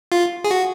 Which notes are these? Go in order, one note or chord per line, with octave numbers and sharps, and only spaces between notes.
F4
G#4
F#4